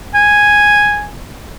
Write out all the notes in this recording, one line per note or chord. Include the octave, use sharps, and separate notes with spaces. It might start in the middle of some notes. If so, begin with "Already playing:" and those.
G#5